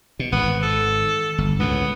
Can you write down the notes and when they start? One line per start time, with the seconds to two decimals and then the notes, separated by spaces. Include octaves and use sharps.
0.19 B2
0.32 G#1 G#2 B3
0.62 A4
1.38 G1
1.60 C#2 A2 B3